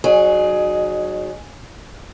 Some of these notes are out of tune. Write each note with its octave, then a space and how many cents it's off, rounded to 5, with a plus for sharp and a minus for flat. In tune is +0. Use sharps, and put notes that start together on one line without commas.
F#3 +0 D#4 -40 G#4 +10